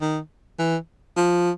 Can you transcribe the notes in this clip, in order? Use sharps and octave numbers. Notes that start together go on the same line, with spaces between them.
D#3
E3
F3